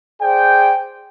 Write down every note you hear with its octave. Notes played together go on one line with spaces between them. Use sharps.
G#4 C5 D5 G5